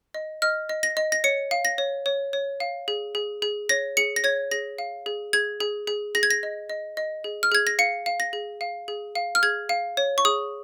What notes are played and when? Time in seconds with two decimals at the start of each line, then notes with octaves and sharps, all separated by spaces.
0.14 D#5
0.42 D#5 F6
0.69 D#5
0.83 A#6
0.97 D#5
1.12 A#6
1.24 C#5 C#7
1.51 F5
1.65 A#6
1.78 C#5
2.06 C#5
2.33 C#5
2.60 F5
2.88 G#4
3.15 G#4
3.42 G#4
3.69 C#5 A#6
3.97 G#4 C#7
4.16 A#6
4.24 C#5 G#6
4.51 G#4 A#6
4.78 F5
5.06 G#4
5.33 G#4 G#6
5.60 G#4
5.87 G#4
6.15 G#4 A#6
6.23 G#6
6.31 A#6
6.43 D#5
6.70 D#5
6.97 D#5
7.24 G#4
7.43 F6
7.52 G#4 G#6
7.67 A#6
7.79 F5 C#7
8.06 F5
8.20 A#6
8.33 G#4
8.61 F5
8.88 G#4
9.15 F5
9.35 F6
9.43 G#4 G#6
9.69 F5
9.97 C#5
10.18 C#6
10.25 G#4 D#6